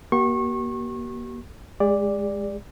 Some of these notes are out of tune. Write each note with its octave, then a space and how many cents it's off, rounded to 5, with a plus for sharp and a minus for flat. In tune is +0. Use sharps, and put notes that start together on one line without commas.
A#3 +35 G4 -45 C#6 -30
G#3 -5 G#4 -45 D5 +0